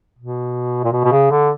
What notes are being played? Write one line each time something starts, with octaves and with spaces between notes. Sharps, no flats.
B2
A#2
B2
B2
C#3
D3